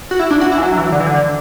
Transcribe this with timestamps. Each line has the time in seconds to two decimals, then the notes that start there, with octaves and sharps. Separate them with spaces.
0.11 F#4
0.19 E4
0.30 D4
0.41 F#4
0.52 E4
0.58 E3
0.63 F#3
0.73 F#3
0.78 E3
0.92 D3
1.00 E3
1.06 D3